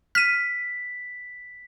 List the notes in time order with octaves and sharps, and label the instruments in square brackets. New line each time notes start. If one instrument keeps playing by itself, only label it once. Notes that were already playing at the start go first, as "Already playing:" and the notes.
[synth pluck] F6 D#7 [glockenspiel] B6